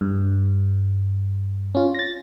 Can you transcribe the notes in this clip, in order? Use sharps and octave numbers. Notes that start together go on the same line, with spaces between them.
G2
C#4 F4
A6 A#6